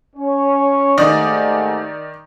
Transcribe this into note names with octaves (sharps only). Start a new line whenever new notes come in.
C#4 C#5
D#2 G#2 D#3 A3 D5 D#5